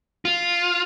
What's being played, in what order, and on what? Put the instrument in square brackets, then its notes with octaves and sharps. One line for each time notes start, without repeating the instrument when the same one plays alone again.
[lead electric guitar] F4